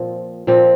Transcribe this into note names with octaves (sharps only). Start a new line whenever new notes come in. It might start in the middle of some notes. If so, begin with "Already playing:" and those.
Already playing: A#2 F3 C4
A#2 F3 C4